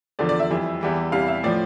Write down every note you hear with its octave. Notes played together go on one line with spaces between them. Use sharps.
E2 D3 F3 D5
D5
E5
F2 E3 G3
E2 E3 G3
E2 C3 E3 G3 F5
E5
A2 F3 D5